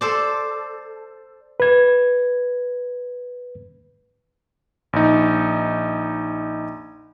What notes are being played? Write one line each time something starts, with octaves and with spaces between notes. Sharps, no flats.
A4 C5 D5
B4 G#6
A#1 D#4